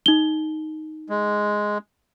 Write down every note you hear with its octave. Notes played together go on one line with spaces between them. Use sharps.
D#4 G7
G#3